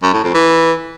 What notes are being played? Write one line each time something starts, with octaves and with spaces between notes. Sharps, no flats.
F#2
A2
F2
E3